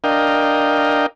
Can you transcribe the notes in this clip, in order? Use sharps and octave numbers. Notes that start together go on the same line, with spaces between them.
D4 A#4 D#5 F5 G5